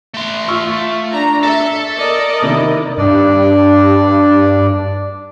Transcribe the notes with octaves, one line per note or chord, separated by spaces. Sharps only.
A3 C6
F4 C#6 E6 F6
D4 A#5
A4 E5
A#4 D5 D#5
C3 D#3 E4
G2 D4 D5